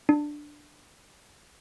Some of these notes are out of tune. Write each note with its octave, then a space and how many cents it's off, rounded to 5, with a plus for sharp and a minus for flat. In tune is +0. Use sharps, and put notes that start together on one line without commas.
D4 +10